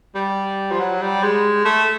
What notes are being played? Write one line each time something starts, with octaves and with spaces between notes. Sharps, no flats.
G3
F3
F#3
G3
G#3
A3